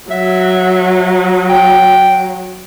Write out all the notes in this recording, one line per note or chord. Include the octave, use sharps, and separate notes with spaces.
F#3 E5
G5